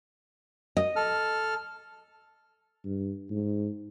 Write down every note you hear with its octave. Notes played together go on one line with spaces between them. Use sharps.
D#5
A4 F6
G2
G#2